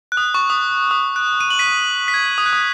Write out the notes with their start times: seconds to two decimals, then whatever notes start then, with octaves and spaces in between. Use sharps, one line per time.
0.12 F#6
0.17 D#6
0.34 C#6
0.50 D#6
0.91 D#6
1.16 F#6
1.40 D#7
1.50 F#7
1.59 B6 D#7
2.08 B6
2.14 G#6
2.38 D#6
2.46 F#6
2.53 D#6